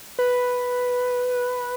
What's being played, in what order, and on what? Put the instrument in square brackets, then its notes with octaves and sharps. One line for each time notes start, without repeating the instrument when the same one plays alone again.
[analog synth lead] B4